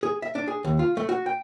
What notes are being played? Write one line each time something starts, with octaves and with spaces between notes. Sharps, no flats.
G#4
E5
D4
G#4
D#2
F4
A3
F#4
G5